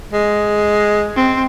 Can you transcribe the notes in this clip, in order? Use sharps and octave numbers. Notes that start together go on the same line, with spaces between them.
G#3
C4